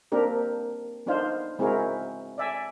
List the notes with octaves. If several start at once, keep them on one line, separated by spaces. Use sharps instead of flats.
A#3 C4 D4 G4 A#4
B3 D4 D#4 F4 C5 F5
G#3 C4 E4 F#4 G#4 A#4
D5 E5 G#5